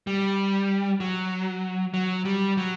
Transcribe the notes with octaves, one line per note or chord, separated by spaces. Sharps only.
G3
F#3
F#3
G3
F#3